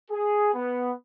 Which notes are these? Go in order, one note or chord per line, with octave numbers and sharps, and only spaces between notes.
G#4
B3